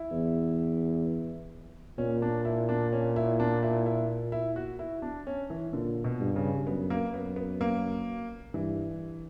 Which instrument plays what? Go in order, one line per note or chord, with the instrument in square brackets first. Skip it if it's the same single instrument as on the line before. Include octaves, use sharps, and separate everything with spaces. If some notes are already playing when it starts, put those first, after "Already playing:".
Already playing: [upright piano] E4
[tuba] E2
[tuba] A#2 [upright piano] C#4
[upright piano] D4
E4
D4
C#4
E4
D4
E4
E4
E4
F#4
E4
D4
C#4
E3
[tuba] A#2 [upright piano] D3
[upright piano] B2
[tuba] G2
[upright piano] C#3
[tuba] F#2 [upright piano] B3
[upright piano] A#3
[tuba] F#2 [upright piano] B3
[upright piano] B3
A#3
[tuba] G2 [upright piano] E3